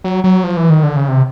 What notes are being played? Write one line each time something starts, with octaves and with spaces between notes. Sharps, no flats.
F#3
F#3
F3
E3
D#3
D3
C#3
C3